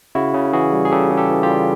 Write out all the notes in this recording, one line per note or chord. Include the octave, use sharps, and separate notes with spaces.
C#3 E4 F#4
C#3
E3 F#4 G#4
G3
G#4
C#3 G4 A4
C#3
G4 A4
E3
F4 G4
G3